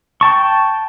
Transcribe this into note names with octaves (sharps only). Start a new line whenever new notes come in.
G5 A5 C#6